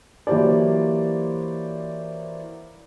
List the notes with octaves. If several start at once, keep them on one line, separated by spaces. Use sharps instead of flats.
E3 F#3 A#3 G4 C5 D5